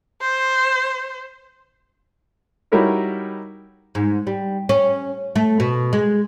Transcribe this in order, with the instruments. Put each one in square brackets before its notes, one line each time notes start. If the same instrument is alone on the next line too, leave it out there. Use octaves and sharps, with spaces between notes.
[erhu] C5
[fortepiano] G3 D#4 E4 F#4 A#4 C#5
[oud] G#2
G3
C#4
A3
B2
G#3